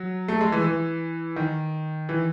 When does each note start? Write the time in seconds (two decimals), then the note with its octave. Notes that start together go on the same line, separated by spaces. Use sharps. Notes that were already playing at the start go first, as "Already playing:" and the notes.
Already playing: F#3
0.28 A3
0.41 G#3
0.52 E3
0.64 E3
1.36 D#3
2.09 E3